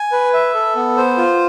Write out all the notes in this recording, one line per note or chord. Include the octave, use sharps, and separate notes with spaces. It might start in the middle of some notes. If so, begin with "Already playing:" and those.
Already playing: G#5
B4
E5
A4
B3
C5
F4